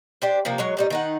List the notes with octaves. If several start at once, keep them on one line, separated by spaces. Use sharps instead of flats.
D4 G4 C5
C3 F3 A#3
F#3 G#3 C#5
A2 G3 D#4
D#3 D#4 F#5